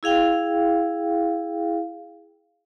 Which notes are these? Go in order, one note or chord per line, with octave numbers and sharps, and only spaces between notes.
E4 G#4 F5 G5